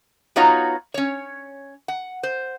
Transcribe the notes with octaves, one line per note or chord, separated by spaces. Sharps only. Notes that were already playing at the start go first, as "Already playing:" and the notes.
B3 D#4 F4 F#4 C#5 A#5
C#4 C#5
F#5
C5